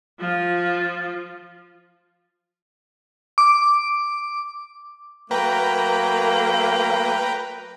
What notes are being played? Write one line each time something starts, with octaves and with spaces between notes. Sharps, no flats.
F3 F4
D6
F#3 A3 A#3 B4 G5 A#5